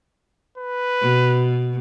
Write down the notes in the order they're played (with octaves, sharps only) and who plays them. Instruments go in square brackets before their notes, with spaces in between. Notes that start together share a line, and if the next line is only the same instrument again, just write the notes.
[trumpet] B4
[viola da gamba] B2